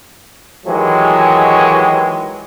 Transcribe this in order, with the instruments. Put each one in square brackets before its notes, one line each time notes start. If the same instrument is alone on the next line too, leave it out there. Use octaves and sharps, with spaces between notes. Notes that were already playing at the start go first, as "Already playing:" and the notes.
[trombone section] D#3 E3 F#3 G#3 G4